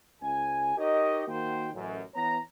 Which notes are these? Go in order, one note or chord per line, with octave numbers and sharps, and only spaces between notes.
C#2 G#5
D#4 G4 A#4 C#5 D#5
D#3 A#3 F#4 C5 G5
A1 F#2
E3 B3 C#5 A#5